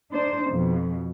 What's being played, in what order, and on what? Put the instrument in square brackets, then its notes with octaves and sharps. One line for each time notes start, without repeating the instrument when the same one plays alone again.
[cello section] D4 D#4 C5
F2 B2